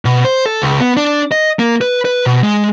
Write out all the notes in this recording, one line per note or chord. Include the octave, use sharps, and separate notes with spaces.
B2
C5
A4
C#2
B3
D4
D#5
A#3
B4
B4
B2
G#3